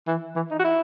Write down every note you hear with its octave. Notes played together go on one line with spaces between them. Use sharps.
E3
E3
D#4
F#4
E4